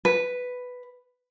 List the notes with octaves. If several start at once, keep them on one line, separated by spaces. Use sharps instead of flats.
B4